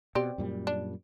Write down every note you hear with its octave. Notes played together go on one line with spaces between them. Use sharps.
B2 C4 G4 D5
F#2 A#2 G3
D4